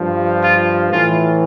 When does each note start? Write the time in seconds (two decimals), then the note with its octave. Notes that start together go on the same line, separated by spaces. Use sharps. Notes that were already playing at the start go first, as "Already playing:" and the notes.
Already playing: G2 F3
0.42 F4
0.90 A2 E3 F4